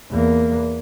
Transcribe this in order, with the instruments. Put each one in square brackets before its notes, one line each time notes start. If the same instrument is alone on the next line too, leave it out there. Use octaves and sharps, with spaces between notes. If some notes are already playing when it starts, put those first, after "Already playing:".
[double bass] E2 A#3